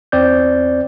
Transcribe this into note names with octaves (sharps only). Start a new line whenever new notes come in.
E2 C4 D5 G6